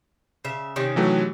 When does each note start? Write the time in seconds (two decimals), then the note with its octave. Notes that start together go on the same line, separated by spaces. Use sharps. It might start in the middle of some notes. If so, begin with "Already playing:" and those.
0.45 C#3 E5
0.76 C3 D#3 C#4
0.96 E3 F#3 A3